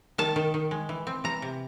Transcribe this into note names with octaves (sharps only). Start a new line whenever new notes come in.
D#3 A5
D#3
D#3
G#3
E3
C4
E3 A#5
C3